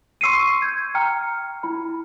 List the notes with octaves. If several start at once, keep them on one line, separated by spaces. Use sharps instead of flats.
C6 C#6 E6 C7 C#7 D#7
G6 G#6
G5 A#5 F6 C#7
E4 B5